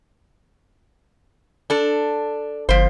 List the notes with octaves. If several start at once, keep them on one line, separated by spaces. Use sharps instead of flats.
D4 A4
G1 F3 C5